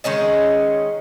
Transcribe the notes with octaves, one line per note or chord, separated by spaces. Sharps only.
D#3 G#3 C#4 D#5